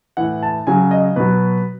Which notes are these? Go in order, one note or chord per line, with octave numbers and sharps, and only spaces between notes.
A2 E3 F#5
A5
C#3 F#3 G#5
D#5
B2 F#3 B4